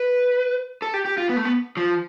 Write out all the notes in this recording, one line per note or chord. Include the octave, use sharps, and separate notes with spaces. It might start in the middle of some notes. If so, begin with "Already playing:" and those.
Already playing: B4
A4
G4
G4
F4
B3
A3
B3
F3